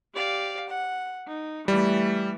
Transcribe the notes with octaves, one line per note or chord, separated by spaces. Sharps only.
G4 D5 F5
F#5
D#4
E3 G3 A3